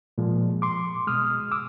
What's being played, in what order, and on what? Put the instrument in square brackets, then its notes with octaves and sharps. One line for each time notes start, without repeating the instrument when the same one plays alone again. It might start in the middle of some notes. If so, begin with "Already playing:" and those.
[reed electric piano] A#2 F3 G#3
C6 D6
B2 G#3 D#6 F6
D6 E6